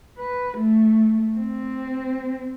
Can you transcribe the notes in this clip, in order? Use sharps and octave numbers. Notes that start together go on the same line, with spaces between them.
B4
A3
C4